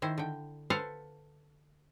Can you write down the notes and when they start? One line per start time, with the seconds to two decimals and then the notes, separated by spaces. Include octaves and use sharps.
0.02 D#3 E4 C5
0.18 D3 G5
0.70 A4 B4 C5 F5 F#5